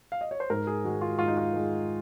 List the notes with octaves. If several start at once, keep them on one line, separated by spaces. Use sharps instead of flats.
F5
D#5
C#5
C5
G#2 A#4
G#4
D#3 G#3 F#4
F4
G#2 F4
D#4
F4
D#3 G#3